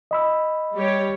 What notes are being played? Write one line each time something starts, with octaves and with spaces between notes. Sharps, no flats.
D#5 B5 E6
G3 G4 C#5